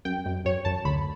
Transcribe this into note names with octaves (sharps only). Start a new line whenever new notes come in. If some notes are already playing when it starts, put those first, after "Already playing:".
F#2 G5
F#2
F#2 C#5
F#2 A5
D2 B5